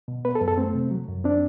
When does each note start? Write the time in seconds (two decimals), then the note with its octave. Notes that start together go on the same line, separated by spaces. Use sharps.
0.08 B2
0.25 B3 B4
0.35 A4
0.41 F#2
0.48 A4
0.58 A3 C4
0.74 C3
0.91 F#3
1.08 F#2
1.24 C4 D4